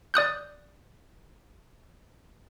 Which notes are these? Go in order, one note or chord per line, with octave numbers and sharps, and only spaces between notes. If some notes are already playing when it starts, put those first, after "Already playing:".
D5 D#6 F#6 G6